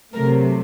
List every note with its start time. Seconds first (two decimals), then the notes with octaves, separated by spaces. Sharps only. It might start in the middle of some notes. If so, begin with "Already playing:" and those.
0.13 C3 F#3 A3 A#4